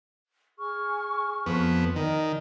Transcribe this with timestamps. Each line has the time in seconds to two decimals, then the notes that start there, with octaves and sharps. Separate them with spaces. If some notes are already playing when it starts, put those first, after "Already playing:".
0.59 G#4 C#6 F6
1.46 F2 B3
1.96 D#3 A#4 D5 D#5